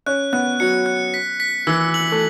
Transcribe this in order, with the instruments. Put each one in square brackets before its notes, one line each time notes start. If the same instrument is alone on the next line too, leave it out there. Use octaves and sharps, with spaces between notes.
[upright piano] C#4 [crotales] F#6
[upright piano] B3 [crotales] F#6
[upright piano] F#3 [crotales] C#7
[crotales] F#6
B6
B6
[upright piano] E3 [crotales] E6
[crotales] F#7
[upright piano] A3